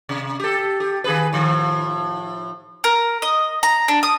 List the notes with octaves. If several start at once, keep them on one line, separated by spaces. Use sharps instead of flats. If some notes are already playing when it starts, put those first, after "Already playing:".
C3
G4 A4
G4
D#3 G#4 B4
A2 D#3 F3
A#4
D#5
A#5
D4
D#6